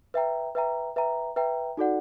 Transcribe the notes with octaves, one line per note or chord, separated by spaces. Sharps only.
B4 E5 G5 A#5
B4 E5 G5 A#5
B4 E5 G5 A#5
B4 E5 G5 A#5
D#4 F#4 A4 D5 F#5